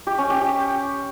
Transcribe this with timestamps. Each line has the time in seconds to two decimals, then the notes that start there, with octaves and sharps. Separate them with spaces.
0.07 G4
0.18 C#4
0.30 G4
0.41 G4